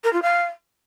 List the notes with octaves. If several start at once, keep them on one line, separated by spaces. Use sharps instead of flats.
A#4
F4
F5